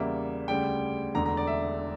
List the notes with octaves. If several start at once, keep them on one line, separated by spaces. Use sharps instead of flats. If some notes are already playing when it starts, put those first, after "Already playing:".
Already playing: E2 C#3 G3 A#3 E5
D2 C#3 G3 G5
E1 E2 D3 A3 A#5
A#5
D5
E5